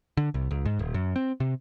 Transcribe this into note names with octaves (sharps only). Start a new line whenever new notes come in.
D3
C2
C#2
G#2
D#1
F#2
C4
C3